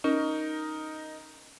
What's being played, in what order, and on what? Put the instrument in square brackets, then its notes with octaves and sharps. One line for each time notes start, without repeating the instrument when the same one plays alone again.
[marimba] C#4 [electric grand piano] D#4 A#4